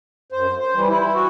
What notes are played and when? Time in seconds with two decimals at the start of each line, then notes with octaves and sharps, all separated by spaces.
0.32 F#2 C5
0.59 C5
0.73 E3 G3
0.87 E4
1.14 F#4